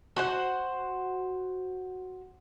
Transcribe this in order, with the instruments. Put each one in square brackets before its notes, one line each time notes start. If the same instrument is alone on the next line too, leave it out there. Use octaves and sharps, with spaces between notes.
[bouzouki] F#4 C5 F#5